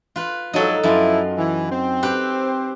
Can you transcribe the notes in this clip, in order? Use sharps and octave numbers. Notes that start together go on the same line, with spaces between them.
F4 B4
G#2 F3 F#3 D#4 A4
F#2 F3 E4 F4
E3
C4
G4 B4